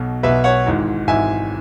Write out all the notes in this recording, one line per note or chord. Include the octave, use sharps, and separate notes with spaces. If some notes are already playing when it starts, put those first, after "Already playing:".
Already playing: B1 B2
B1 B2 B4 E5
C#5 F#5
G#1 G#2 E3
G#1 G#2 E3 E5 G#5